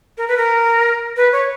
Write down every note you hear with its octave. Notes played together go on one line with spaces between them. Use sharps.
A#4
B4
A#4
B4
C#5